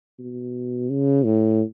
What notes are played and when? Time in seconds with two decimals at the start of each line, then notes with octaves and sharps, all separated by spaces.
0.19 B2
0.90 C#3
1.25 A2